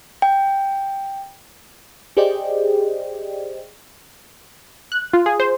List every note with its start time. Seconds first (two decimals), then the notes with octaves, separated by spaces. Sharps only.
0.22 G5
2.17 G4 G#4 C5 D5 D#5 G5
4.92 F#6
5.13 F4
5.26 G#4
5.40 C5